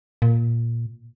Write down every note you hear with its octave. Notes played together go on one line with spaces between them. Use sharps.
A#2